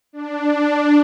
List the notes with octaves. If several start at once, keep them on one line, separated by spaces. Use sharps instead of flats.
D4